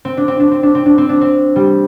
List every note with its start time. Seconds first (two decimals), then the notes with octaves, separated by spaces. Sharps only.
0.05 C4
0.17 D4
0.28 C4
0.40 D4
0.51 C4
0.63 D4
0.75 C4
0.86 D4
0.98 C4
1.09 D4
1.21 C4
1.56 G3